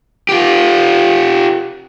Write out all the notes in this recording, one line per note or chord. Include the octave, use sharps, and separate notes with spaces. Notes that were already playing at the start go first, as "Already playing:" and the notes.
F4 G4